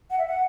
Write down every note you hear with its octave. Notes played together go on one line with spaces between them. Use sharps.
F#5
E5
F#5